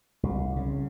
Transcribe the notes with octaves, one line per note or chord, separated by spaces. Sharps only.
C2
C#3